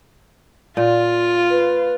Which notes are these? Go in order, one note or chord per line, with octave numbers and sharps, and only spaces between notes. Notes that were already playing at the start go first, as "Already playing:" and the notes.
A#2 F4
B4